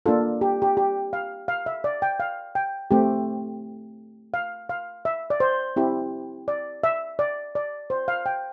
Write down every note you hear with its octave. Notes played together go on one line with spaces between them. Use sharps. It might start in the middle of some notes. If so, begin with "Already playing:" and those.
A#3 D4 F4 A4
G4
G4
G4
F5
F5
E5
D5
G5
F5
G5
A3 C4 G4
F5
F5
E5
D5
C5
C4 E4 G4
D5
E5
D5
D5
C5
F5
G5